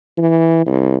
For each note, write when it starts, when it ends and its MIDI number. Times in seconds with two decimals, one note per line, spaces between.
0.18 0.64 52
0.66 0.96 36